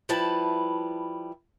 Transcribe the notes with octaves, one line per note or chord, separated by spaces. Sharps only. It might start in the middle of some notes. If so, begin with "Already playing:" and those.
F3 G3 E4 B4 A5